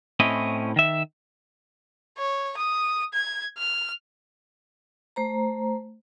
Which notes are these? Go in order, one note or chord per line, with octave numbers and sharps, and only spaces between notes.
A2 C4 C#4 E4 D#5
D#3 E5
C#5
D#6
G#6
F6
A3 C5 A#5